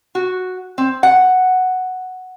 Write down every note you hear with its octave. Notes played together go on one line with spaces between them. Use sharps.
F#4
C4
F#5